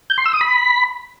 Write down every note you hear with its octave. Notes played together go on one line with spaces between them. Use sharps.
G6
C6
E6
D#6
B5